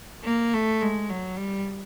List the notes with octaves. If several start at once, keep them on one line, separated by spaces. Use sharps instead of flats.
A#3
A3
G#3
F#3
G3